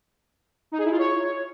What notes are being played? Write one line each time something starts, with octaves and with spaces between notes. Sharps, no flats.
D#4
G#4
E4
F4
C#5